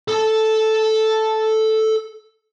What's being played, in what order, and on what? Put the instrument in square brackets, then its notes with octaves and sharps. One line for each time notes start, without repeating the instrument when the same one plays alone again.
[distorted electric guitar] A4 A5